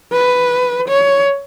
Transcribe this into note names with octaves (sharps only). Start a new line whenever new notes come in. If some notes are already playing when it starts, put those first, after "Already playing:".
B4
C#5